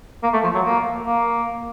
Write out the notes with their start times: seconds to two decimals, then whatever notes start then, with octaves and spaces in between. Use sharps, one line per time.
0.23 A#3
0.33 A3
0.44 F3
0.54 F#3
0.65 A#3
1.06 A#3